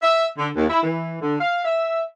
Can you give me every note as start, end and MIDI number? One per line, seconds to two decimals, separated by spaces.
0.02 0.26 76
0.37 0.49 50
0.56 0.65 39
0.69 0.79 64
0.83 1.21 52
1.21 1.34 50
1.40 1.60 77
1.64 2.02 76